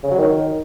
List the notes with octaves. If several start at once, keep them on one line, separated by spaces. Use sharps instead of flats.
C#3
F#3
D#3